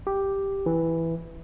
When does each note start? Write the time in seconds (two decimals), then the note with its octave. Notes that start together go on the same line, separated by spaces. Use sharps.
0.07 G4
0.66 E3